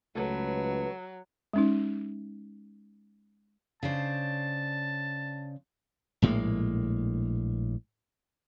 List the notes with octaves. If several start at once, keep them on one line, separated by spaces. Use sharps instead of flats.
C#2 F#3 A3 B4
G#3 C#4 D#4
C#3 D4 C5 A5
A#1 A2 G#3 A#3